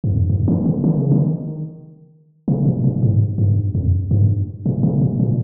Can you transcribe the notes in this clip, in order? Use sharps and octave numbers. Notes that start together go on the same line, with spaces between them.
G2
F2
G2
D#3
C#3
D#3
C#3
D#3
C3
A#2
A#2
G#2
G2
F2
G2
A#2
C3
A#2
A#2